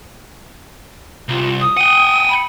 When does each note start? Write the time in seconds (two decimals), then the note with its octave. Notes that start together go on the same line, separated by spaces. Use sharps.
1.29 C2 F4
1.60 D#6
1.77 F#5 G5 D#7
2.28 B5